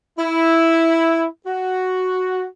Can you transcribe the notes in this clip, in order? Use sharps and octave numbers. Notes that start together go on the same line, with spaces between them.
E4
F#4